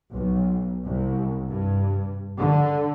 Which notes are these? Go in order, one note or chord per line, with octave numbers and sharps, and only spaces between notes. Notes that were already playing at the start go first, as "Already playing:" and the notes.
B1
C2
G2
D3